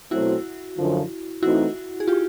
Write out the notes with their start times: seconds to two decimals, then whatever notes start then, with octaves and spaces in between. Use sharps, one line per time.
0.11 B2 F#3 A3 C4 E4 F#4
0.77 F#2 D3 F3
1.42 E3 A3 C4 D#4 E4 F#4
2.00 G#4
2.08 F4 G4